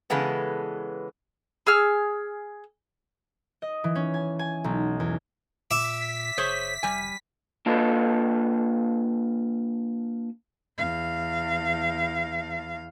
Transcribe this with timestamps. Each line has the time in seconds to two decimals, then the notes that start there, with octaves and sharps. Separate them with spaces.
0.10 C#3 E3 G#3 B3 A4
1.67 G#4 E6 F6
3.62 D#5
3.84 E3
3.95 C#4
4.14 G#5
4.39 G#5
4.64 B1
5.00 E2
5.71 A#2 E5 D6 B6
6.38 F#1 G#4 C5 C#5
6.83 F1 G3 G#5
7.66 A#3 D4 F4 A4 B4 D#5
10.78 E2 F5